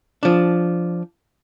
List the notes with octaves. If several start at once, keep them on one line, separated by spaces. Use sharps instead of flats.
F3 D4